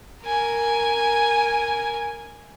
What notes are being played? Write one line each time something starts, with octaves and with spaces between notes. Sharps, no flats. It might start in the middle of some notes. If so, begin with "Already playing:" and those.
A#4 G#5